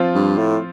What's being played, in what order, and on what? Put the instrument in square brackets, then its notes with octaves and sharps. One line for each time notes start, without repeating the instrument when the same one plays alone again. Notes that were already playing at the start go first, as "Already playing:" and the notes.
Already playing: [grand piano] F3 C4 F4
[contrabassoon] G2
A2